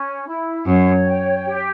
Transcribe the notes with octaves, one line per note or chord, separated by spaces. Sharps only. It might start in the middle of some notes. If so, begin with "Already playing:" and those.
Already playing: C#4
E4
F#2 C#5
G5
G4